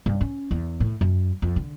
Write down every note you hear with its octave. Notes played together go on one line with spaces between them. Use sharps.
G2
C#4
E2
A2
F#2
F2
D3